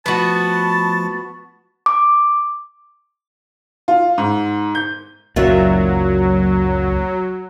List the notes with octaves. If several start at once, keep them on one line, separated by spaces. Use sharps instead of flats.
F3 A3 B3 F4 F#4 A5
D6
F4
G#2
G6
F#1 C#2 F#2 A#2 F#3 F4 E5